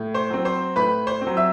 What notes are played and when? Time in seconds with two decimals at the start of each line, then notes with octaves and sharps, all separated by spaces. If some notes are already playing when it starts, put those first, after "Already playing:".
Already playing: A2
0.14 C5 C6
0.30 F#3 C4
0.45 C5 C6
0.76 A2 B4 B5
1.07 C5 C6
1.21 C4
1.27 F#3
1.37 E5 E6